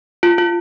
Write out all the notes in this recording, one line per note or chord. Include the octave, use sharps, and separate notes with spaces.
F4
F4